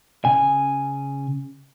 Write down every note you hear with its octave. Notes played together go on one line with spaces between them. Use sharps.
C#3 G#5